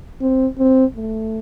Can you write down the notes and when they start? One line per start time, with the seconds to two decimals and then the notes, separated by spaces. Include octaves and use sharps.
0.21 C4
0.59 C4
0.96 A3